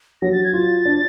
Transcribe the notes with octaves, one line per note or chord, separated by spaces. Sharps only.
F#3 A#6
A6
G#6
F4 A6
D4